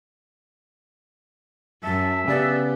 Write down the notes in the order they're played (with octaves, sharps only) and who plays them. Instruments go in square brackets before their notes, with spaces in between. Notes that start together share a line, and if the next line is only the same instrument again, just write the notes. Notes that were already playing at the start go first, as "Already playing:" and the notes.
[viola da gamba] F#2 [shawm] E5 [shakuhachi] A5
[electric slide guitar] C#3 B3 [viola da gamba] G4 [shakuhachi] D5